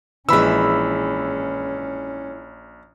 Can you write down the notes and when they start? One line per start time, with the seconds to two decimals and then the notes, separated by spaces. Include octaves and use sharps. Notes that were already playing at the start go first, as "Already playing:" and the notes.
0.29 A#1 E3 G#3 C#4 B5 E6